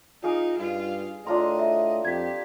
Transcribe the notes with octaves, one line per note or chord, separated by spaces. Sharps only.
D#4 F4 G#4 F5 D6
G2 F4
A2 D4 F4 D#5 A#5 C6
E5
F2 G4 G#6 B6